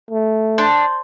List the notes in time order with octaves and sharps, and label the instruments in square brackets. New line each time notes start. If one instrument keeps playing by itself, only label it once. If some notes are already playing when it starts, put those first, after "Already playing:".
[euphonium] A3
[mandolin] D4 [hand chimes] C5 C6 G6